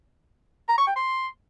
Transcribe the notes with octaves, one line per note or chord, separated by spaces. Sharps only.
A#5
C#6
G5
C6